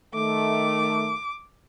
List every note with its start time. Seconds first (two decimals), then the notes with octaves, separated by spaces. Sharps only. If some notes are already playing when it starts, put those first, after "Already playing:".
0.14 D#3 A3 D6